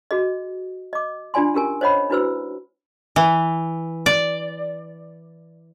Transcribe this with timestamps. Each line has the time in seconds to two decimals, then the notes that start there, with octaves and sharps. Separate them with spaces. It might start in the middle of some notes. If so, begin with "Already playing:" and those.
0.11 F#4 G#4 D#5
0.93 D#5 D6
1.34 D4 F4 D5 G#5 C6
1.54 C#4 G4 A#4 G#5
1.81 C5 C#5 D#5 F#5 B5
2.10 D4 E4 F#4 B4 C5 E6
3.16 E3
4.06 D5